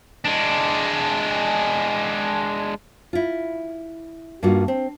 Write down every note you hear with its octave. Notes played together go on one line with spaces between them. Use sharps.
G#3 D4
E4 F4
G2 A#3 D#4 F4 F#4
C4